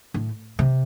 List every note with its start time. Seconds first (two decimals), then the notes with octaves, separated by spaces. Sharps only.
0.14 A2
0.59 C3